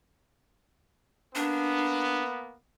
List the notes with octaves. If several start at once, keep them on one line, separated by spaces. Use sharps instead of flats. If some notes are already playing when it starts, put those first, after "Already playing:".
A#3 B3 D4